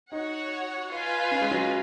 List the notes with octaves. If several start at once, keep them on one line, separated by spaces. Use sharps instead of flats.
D#4 F#4 C#5 F#5
F4 B4 F5 G#5
C#4
G#3
F#3